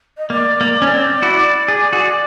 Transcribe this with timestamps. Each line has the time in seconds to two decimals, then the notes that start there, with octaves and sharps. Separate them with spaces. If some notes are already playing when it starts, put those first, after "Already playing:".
0.17 D#5
0.30 A#3 D5
0.61 A#3
0.82 C#4
0.91 C4
1.22 E4 F#4
1.68 G#4
1.93 F#4 G#4